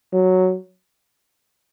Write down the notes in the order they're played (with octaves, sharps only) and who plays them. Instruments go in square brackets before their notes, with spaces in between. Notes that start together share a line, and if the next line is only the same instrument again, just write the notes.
[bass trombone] F#3